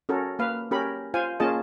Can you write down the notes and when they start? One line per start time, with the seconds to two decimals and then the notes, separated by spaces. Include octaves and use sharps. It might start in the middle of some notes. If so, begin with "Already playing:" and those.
0.09 C#4 F#4 A4 A#4
0.39 A#3 B4 F5
0.71 C#4 G4 A#4 B5
1.14 F4 C5 F5 G#5
1.40 A#3 C#4 F4 G#4 D#5 A5